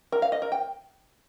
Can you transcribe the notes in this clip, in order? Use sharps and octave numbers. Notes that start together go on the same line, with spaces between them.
A#4
F5
D#5
A#4
G5